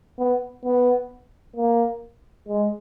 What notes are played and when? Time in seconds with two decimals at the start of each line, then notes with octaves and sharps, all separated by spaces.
0.19 B3
0.65 B3
1.57 A#3
2.48 G#3